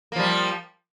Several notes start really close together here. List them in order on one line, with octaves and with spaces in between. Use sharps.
A#3 F3 G3